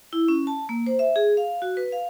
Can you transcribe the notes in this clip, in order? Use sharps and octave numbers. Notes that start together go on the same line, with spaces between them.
E4
C#4
A5
A#3
C5
E5
G#4
F5
F#4
B4
F5